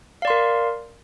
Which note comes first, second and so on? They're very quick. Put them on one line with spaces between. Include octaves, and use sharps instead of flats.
F5 D5 C6 A#4